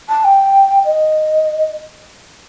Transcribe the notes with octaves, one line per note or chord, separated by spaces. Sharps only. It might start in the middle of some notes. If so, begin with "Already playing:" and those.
A5
G5
D#5